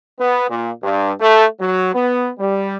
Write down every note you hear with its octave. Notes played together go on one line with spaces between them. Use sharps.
B3
A#2
G2
A3
F#3
B3
G3